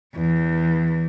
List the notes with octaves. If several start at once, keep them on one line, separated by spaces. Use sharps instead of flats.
E2